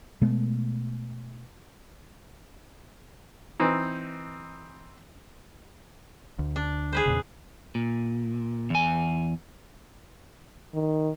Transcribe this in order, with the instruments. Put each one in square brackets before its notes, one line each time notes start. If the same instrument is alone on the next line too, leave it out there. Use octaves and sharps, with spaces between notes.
[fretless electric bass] B2 G#3 A3 B3
[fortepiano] E3 C4 D#4
[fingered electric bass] D2
[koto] D4
G#4 B4 C5
[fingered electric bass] E2 A#2 C#3
[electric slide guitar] A#2
E2 G#5
[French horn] D#3